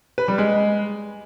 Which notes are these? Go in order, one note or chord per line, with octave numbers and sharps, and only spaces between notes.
B4
G3
G#3